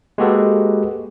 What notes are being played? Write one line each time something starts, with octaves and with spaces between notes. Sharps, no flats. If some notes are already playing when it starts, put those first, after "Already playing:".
G#3 A#3 F#4 G4 A4 B4